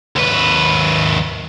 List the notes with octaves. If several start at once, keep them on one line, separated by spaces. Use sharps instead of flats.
D#2 B4